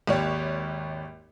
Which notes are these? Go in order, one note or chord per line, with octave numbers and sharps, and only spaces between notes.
G#1 D#2 C#5